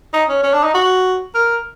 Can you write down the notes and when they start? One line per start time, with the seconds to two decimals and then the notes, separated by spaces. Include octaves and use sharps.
0.13 D#4
0.29 C#4
0.43 C#4
0.53 D4
0.64 D#4
0.74 F#4
1.34 A#4